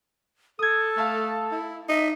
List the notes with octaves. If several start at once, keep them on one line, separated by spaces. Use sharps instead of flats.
A4 D#6 G#6
A3 F5 A5 F6
E4
D#4 E5